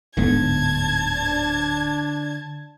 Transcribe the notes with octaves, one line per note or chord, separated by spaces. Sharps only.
D1 G#2 D3 B3 A5 G#6
D4